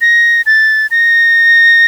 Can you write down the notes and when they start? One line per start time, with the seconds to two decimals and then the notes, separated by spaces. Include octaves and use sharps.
0.01 A#6
0.46 A6
0.91 A#6